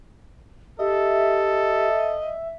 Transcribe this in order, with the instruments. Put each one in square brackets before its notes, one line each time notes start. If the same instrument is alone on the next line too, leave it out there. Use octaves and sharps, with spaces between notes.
[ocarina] G4 [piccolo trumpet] A4 [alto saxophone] D#5 [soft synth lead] E5